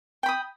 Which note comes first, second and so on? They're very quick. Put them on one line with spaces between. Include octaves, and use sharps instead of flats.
G5 B5 D#6